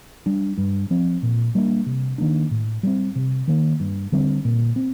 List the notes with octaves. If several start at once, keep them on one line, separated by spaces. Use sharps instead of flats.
G3 D4
G2
F3 C4
A#2
G3 A#3 D4
C3
D#3 A#3 D4
A2
G3 C4
C3
D#3 A#3
G2
D3 G3 C4
A#2
C4